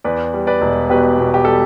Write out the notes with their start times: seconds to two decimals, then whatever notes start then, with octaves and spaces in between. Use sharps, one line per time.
0.04 E2 B4 D5
0.34 G3
0.47 B4 D5
0.62 E1
0.90 B2 G4 B4
1.19 B2
1.34 G4
1.45 G3 A4